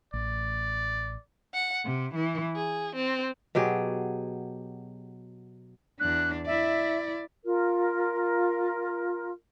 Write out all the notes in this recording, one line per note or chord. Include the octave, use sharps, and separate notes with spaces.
A1 D5
F#5
C3
E3
G#4
C4
B2 F#3 G4 G#4
E2 D4 F#6
E4 D5 E5
F4 A#4